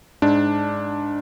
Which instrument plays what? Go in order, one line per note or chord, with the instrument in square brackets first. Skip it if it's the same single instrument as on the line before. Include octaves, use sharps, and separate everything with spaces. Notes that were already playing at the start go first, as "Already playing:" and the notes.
[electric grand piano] G#2 D4